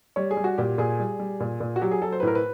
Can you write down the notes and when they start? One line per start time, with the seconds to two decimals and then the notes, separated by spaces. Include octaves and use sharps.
0.16 G3 C#5
0.31 G#4
0.37 G3
0.44 F#4
0.58 A#2 G4
0.78 A#2 G#4
1.00 G3
1.20 G3
1.40 A#2
1.60 A#2
1.76 F#4
1.82 F#3 G4
1.91 G#4
2.01 F#3 A4
2.12 C5
2.20 B4
2.23 A2 A#4
2.35 B4